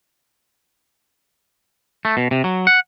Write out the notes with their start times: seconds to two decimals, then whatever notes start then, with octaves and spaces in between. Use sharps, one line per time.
2.05 A3
2.17 B2
2.31 C3
2.44 F#3
2.67 F#5